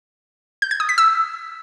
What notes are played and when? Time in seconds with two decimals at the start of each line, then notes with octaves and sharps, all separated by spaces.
0.62 G6
0.71 G#6
0.80 D#6
0.89 B6
0.98 E6